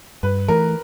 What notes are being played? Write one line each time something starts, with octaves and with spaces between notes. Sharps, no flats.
G2 B4
E3 A3 A#4